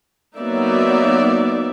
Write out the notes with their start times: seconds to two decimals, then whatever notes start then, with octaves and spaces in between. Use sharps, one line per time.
0.37 F#3 A#3 B3 D#4 D5 E5